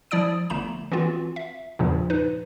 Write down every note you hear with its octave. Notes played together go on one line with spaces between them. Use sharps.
F3 E4 D5 D#6 D7
G1 A3 A#5 E7
E3 B3 C4 F4 F#4
E5
E2 G2 A#2 C#3 F3
D#4 B4